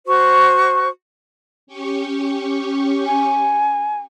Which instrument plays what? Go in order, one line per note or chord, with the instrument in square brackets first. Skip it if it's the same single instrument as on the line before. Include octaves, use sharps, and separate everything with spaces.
[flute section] F#4 C5 C#6
[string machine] C#4 G4 C#6
[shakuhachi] G#5